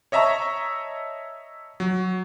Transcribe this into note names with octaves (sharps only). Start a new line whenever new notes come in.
C#5 D#5 E5 A5 A#5 C#6
F#3